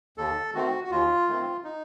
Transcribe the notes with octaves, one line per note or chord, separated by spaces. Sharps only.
D#2 A4
D#3 A3 C4 F#4
F#4
D#2 F4
D#3 A3 C4
D#4